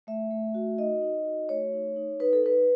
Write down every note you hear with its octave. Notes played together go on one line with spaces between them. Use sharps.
A3 E5
A3
F#4
D#4 D#5
D#4
F#4
A3 C#5
D#4
D#4
D#4 B4
A4
D#4 B4